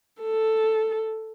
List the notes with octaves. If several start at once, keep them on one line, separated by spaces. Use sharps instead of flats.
A4